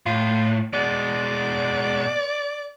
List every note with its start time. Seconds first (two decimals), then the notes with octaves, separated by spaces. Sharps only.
0.06 A2 F4
0.73 B2 G#3 D5